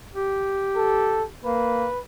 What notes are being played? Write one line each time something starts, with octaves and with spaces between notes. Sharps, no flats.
G4
A4
A#3 B4